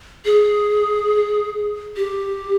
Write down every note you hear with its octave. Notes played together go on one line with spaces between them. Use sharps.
G#4
G4